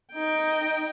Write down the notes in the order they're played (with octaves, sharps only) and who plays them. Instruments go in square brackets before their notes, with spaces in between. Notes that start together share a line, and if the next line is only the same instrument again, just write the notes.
[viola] D#4 G5